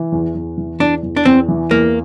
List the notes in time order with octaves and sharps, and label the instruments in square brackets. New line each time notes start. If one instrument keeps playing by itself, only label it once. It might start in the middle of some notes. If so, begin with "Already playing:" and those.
Already playing: [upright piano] E3
E2
E2
E3
[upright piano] E2 [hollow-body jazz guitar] D4
[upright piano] E2
[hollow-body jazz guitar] D4
[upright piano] E2 [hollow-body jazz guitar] C4
[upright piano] E3
[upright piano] E2 [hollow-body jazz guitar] A#3